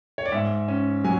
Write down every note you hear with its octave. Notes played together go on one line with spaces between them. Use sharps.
C#5
D5
G#2 E5
C#4
F#3 G#5